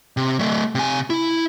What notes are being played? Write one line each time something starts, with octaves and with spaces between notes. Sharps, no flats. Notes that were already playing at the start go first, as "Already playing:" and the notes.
C3
F#3 A3
C3 G#5
E4